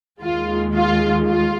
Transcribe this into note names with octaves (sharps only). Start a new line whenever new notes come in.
D#2 D#3 G#3 F4
F4
F4